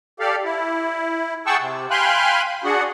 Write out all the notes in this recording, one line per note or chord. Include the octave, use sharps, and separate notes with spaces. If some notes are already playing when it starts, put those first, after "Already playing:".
G4 A4 D5 F5
E4
G#4 F#5 G5 A5 C#6 E6
C3
F5 G5 G#5 B5 C6 F#6
D4 F#4 G#4 F#5